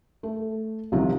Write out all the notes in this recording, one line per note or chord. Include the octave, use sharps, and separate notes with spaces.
A3
C2 C3 D#3 F3